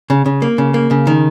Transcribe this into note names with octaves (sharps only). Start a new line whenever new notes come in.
C#3
C#3
A#3
C#3
A#3
C#3
D#3